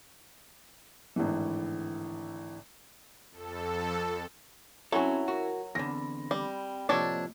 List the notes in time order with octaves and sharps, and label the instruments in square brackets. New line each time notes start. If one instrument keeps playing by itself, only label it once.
[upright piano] G#1 A2 D3 E3
[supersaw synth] F2 A4
[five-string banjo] F#3 [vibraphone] C4 C#4 [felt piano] E4 C#5 G#5 [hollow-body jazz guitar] F#4 A4
[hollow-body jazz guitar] F#4 [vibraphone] A#4
[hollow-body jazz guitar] E2 D3 [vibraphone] C4 B5 [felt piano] A#6
[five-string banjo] G3
[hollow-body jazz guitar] A2 C3 F3 [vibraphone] A#3 D#5 [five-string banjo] D4 A4 C#5